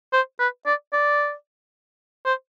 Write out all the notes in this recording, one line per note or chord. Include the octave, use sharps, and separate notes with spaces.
C5
B4
D5
D5
C5